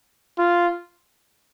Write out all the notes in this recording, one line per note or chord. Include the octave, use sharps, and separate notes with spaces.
F4